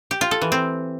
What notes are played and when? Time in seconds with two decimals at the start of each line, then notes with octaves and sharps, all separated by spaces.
0.11 G4
0.21 F4
0.31 A4
0.42 E3
0.52 C4